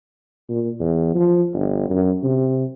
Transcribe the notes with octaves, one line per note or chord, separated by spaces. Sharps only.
A#2
E2
F3
G1
F#2
C3